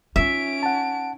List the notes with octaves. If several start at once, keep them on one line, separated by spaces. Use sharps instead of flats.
C#4 D#4 F4 E5 D7
F#5 A5